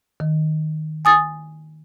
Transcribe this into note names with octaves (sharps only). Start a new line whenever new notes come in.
D#3
G#5 D#6 A6